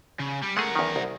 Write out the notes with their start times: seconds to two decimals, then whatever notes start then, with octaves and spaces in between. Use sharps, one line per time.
0.19 C#3
0.42 G3
0.57 G#3 A3 G#4 A#4 F#5
0.76 E2 D#3
0.96 C2